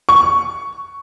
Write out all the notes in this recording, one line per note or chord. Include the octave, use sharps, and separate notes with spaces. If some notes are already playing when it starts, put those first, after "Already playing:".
C#6